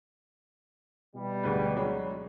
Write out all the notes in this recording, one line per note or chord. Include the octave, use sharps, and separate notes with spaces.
B2 E3 G3
D2 G#3 B4
F#3 G#3